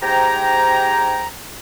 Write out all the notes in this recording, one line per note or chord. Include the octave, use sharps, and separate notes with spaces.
G#2 G4 C5 G5 G#5 A#5